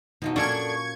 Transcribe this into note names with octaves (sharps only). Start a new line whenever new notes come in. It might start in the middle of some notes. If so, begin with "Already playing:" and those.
B2 F3 F#3 D#4
F#2 A#2 C#4 D4 A4 C#6 G#6